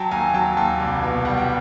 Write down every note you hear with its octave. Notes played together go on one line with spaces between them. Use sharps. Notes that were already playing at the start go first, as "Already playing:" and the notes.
Already playing: F#3 G5 A5
D#2 G#5 A#5
F#3 G5 A5
D#2 G5 A5
C2
B2
G3 F#5
G5